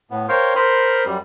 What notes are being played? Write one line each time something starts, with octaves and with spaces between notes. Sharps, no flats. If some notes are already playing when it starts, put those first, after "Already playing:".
A2 B3
A#4 C5 C#5 F5 G5 C6
A#4 C5 B5 C6 D#6 F6
F#2 G3